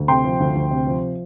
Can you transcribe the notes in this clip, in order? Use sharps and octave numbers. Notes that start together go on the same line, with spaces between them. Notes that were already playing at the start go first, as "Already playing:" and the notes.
Already playing: D2
C3 G5 C6
F3
D2
D2
C3
F3